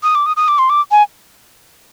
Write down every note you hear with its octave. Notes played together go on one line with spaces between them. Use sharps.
D#6
D6
D#6
D#6
D6
C6
D6
G#5